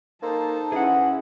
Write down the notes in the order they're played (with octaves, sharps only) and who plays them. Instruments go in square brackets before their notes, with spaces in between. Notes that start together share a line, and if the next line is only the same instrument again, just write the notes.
[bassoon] A#3 [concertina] D#4 A4 C5 [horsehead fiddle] A5
[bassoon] E3 [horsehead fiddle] C#4 E4 [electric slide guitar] G#4 F#5